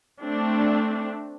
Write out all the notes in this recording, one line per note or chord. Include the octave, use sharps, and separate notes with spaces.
A3 C4 D4